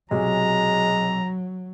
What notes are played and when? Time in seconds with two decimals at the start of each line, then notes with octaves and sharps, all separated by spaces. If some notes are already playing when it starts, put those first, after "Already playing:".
0.11 B1 C3 F#3 G#3 A#5